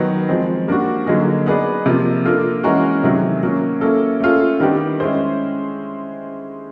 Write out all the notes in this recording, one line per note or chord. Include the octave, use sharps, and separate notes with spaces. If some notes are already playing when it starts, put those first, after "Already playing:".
Already playing: D#3 F#3 B3
F3 G#3 C4
G3 A#3 D4 F#4
D3 F#3 A#3 D#4 G#4
B3 D#4 G#4 B4 D5
C3 F3 A#3
A#3 D4 F4 A4
E3 G#3 C#4 F#4 A#4
C3 D#3 F#3 A3
F#3 A#3 C#4
A#3 C#4 E4 A4
A3 C#4 F4 A4
D#3 G3 B3 D4 G4
G#3 C#4 E4 G#4 C5